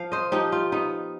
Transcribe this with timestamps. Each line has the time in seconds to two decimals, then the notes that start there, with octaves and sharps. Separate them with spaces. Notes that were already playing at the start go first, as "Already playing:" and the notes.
Already playing: F3 F5
0.12 C5 D#5
0.32 F3 D#4 G4
0.52 F4
0.72 B3 D#4